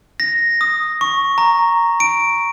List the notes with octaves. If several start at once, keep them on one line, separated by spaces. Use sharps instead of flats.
A#6
D#6
C#6
A#5
D7